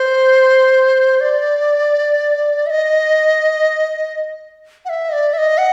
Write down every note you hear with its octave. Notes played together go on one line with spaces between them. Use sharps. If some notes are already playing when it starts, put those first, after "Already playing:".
Already playing: C5
D5
E5
D#5
F#5
E5
D#5
D5
E5
D#5
F#5